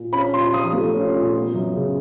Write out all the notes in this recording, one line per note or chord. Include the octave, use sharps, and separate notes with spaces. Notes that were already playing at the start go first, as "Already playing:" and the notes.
Already playing: A#2
C#4 B5
A#2 C6
F3 D#6
A3
C#4
A#2
B3
F#2
C#3